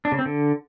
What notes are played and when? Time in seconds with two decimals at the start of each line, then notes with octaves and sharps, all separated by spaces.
0.05 D4
0.12 C#3
0.19 C4
0.26 D3